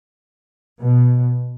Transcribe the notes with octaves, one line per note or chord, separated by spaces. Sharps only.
B2